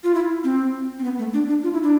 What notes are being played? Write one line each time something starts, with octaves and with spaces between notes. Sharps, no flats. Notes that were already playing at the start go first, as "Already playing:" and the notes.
F4
E4
C4
C4
B3
A3
D4
D4
F4
E4
D4